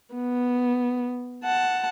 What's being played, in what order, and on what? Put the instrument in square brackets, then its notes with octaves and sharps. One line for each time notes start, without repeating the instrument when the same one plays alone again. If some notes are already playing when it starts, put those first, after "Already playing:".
[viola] B3
F#5 A5